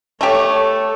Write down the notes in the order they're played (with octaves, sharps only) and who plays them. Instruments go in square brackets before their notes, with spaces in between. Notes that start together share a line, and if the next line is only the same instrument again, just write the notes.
[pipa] A3 G4 [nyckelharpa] A4 C#5
[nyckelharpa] A4